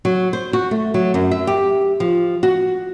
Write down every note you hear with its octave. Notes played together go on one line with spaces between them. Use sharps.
F#3
C5
F#4
A3
F#3
F#2
E5
G4
F3
F#4